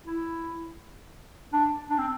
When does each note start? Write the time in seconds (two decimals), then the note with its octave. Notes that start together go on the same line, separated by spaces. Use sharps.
0.06 E4
1.53 D4
1.90 D4
1.98 C4